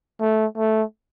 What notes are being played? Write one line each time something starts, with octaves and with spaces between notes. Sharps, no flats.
A3
A3